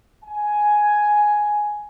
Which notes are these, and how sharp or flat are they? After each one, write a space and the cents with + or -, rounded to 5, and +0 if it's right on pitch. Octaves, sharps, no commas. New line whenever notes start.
G#5 +5